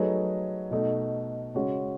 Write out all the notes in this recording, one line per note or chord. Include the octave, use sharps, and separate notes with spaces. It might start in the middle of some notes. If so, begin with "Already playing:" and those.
Already playing: F#3 A3 D#4 G#4 B4
B2 A3 D#4
C#3 G#3 C#4 F#4